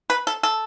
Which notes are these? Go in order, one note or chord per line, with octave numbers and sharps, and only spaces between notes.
B4
A4
A4